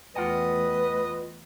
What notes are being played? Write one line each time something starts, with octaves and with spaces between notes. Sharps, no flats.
E2 A3 F4 B4 D#5 F#5 G5